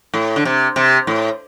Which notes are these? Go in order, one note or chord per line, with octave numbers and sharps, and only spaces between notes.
A2
D3
C3
C3
A2